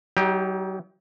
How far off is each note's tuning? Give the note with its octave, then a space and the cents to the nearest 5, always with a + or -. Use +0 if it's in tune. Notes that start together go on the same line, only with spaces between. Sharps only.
F#3 +40 D#4 +30 G4 +10